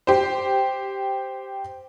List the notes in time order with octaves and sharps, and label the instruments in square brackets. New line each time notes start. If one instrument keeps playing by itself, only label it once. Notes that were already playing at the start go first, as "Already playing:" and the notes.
[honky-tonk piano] G4 C5